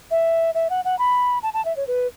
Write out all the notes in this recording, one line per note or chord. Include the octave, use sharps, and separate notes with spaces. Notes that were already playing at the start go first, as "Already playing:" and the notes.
E5
E5
F#5
F#5
B5
A5
A5
E5
C#5
B4